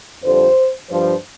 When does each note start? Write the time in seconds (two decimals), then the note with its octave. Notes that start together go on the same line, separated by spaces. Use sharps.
0.24 F2 D3 G3 C5
0.90 G2 F3 C5